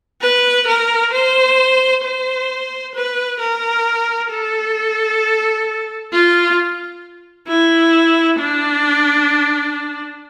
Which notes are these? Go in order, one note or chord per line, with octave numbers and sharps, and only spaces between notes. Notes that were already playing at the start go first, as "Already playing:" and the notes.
B4
A#4
C5
C5
B4
A#4
A4
F4
E4
D4